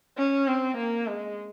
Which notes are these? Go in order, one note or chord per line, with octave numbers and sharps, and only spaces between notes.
C#4
C4
A#3
G#3